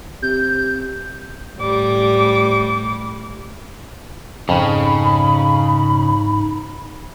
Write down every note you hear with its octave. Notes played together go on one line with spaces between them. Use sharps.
C3 G6
A2 G3 D6
F2 G#2 C#3 D#4 B5